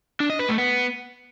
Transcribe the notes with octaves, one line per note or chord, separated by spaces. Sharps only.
D4
D#5
B4
A3
B3